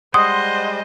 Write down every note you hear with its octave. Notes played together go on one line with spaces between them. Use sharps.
G3 G#3 C5 D#5 F#5 C6 D#6